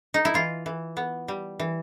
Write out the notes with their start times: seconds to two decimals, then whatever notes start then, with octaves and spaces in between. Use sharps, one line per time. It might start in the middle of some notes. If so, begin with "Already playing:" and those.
0.14 D#4
0.25 E4
0.34 E3 F4
0.66 E3
0.97 B3
1.28 G3
1.60 E3